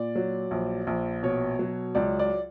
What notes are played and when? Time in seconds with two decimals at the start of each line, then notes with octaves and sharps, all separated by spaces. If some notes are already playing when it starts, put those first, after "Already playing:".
Already playing: A#2 D5
0.15 F#3
0.51 A#1
0.87 A#1
1.23 B2 C#5
1.59 F#3
1.95 C#2 D5
2.19 D5